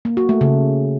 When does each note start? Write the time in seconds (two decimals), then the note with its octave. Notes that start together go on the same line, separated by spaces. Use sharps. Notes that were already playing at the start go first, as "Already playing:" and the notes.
0.05 A#3
0.17 F#4
0.29 A3
0.41 C#3